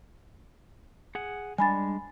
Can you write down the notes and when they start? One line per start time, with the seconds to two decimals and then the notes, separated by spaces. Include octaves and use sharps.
1.15 G#4 F#5
1.58 G3 G#3 D4 G#5 B5 A6